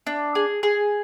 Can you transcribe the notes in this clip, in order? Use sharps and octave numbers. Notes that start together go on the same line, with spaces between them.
D4
G#4
G#4